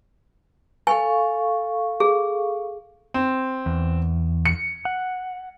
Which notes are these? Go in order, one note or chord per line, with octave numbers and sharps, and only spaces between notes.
A4 F5 G#5 C#6
G#4
C4
E2
C#7
F#5